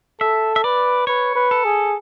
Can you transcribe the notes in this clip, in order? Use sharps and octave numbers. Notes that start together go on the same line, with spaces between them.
A4 E5
E5
B4 D5
B4 C#5
B4
A4
G#4